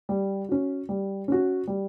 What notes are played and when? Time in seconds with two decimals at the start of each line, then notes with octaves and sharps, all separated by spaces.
0.09 G3
0.49 C#4 F#4
0.89 G3
1.28 C#4 F#4
1.67 G3